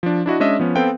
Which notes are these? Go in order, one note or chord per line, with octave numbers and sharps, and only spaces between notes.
F3 D4
D4 E4 F#4 D#5
G#3 C#4 D4 D#5 E5
F3 B3 C#4
B3 C4 A4 B4 F5 G5